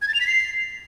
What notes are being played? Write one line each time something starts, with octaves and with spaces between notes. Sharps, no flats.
G#6
A6
F7
B6
C7